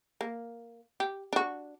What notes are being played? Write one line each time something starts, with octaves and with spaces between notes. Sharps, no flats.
A#3
G4
D4 F#4